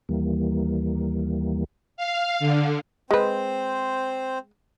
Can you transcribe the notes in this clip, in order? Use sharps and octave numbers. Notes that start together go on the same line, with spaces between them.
D#2 E3 G3 A#3
F5
D3
G#3 C4 B4 C5